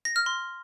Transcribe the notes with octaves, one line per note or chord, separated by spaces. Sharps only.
A#6
F6
C6